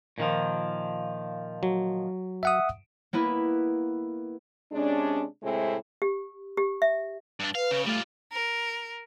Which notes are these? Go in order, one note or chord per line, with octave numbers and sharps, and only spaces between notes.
A#2 D#3 F3
F#3
E5 F#5 D#6
A#3 B3 E4 B4
C3 G#3 C#4 D4
A2 C3 G#3 A3 C4 E4
G4
G4
E5
G2 D4
B4 F5
C#3
G3 A3 F4
A#4